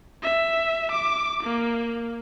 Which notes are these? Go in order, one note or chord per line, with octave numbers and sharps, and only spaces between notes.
E5
D6
A#3